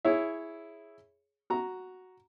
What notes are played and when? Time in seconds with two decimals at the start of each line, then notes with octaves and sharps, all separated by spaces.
0.05 E4 G#4 C#5 E5
1.50 F#4 A#5